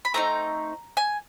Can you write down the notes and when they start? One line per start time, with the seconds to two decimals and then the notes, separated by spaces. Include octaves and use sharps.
0.05 B5
0.14 A3 C4 D#4 A#5
0.97 G#5